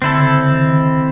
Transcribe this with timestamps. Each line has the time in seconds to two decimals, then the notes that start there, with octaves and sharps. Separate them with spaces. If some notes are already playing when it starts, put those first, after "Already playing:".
0.02 D3 C4 E4 A4
0.18 C#3
0.34 D3
0.50 D#3
0.66 D#3